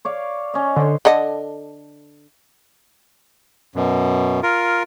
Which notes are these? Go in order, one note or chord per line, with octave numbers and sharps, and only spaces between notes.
C#5 D5 F5
C#4 D#5
D3 C5 C#5
D3 A4 D#5
F#2 B2
F4 A#4